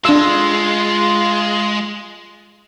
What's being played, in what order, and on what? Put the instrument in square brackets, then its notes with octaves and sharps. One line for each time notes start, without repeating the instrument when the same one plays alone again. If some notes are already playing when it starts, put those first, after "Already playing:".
[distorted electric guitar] G#3 [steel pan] D4 E6 [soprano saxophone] F4